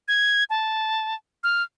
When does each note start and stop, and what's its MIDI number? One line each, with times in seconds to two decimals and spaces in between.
0.08 0.44 92
0.50 1.15 81
1.44 1.63 89